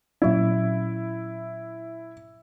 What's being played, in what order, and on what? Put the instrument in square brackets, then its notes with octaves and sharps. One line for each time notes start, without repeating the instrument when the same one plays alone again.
[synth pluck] A#2 F#3 C#4 [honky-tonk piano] E4